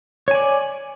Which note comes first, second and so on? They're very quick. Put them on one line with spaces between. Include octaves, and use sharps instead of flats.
C#5 G#5 D5